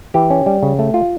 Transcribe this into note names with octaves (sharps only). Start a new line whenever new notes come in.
E3 G4
C#4
G3
C#3
A3
F4